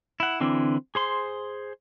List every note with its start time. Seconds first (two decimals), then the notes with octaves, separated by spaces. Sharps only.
0.20 E4 F#5
0.40 D3 E3 C4 D4 E4
0.95 G#4 C5 C6